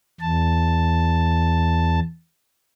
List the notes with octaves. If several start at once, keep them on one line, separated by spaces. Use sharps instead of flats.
E2 A5